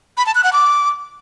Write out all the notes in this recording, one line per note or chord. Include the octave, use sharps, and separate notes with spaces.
B5
A5
F#6
F#5
D6